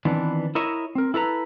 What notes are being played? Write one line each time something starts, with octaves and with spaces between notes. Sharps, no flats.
D#3 E3 B3 C4 D4
E4 A#4 C#5 D#5 E5
C4 A#4
E4 A4 B4 A#5